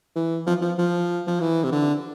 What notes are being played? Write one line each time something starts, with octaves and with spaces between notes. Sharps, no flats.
E3
F3
F3
F3
F3
E3
C3
D3